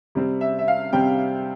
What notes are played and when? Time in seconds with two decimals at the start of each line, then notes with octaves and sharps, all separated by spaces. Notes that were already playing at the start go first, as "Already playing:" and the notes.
0.15 C3 G3 C4
0.41 E5
0.59 E5
0.68 F5
0.93 C3 G3 C4 G5